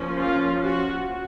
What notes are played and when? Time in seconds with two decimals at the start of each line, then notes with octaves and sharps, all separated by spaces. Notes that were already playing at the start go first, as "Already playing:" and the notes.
Already playing: F3 A#3 C#4
0.19 F4
0.62 F#4